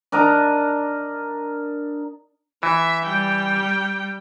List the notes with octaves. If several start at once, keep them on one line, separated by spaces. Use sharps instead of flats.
D4 A#4 D#5 A#5
E3 E5
G3 G5